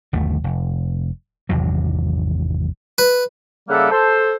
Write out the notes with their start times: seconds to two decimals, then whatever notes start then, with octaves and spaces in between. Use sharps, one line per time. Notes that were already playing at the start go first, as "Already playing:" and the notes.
0.13 G1 D#2 A3
0.44 F1
1.49 G#1 E2 C3 F#3
2.98 B4
3.69 C#3 G3 A#3 A4 E5 F#5
3.91 A4 C5